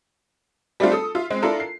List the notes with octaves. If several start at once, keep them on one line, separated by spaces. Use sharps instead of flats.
G3 A3 C4 D4 F4
A4 D#6
F4 E5
G#3 C4
D4 E4 F4 A4 A#4
C7